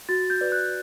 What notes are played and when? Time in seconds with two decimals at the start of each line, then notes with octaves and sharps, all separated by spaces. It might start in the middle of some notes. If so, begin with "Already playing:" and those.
0.09 F#4 A6
0.30 G6
0.41 B4 D5
0.52 F#6